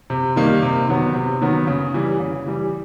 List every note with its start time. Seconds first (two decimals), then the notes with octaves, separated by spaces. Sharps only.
0.10 C3
0.36 D#3 G3 A#3 D#4
0.62 C3
0.89 D#3 F#3 B3
1.15 C3
1.42 D#3 F#3 B3
1.67 C#3
1.94 E3 G3
2.20 C#3
2.46 E3 G3